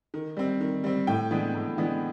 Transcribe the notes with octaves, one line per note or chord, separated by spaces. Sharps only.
D#3
G3 C4
D#3
G3 C4
A2 G5
E3 G#3 B3 D4
A2
E3 G#3 B3 D4